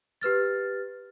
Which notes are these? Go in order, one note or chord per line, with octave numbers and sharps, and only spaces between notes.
G4 B4 F6 A6